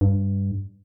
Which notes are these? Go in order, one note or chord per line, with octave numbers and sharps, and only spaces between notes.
G2